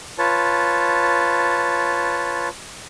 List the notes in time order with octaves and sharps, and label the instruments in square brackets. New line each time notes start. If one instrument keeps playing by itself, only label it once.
[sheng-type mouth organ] F4 B4 C#5 A5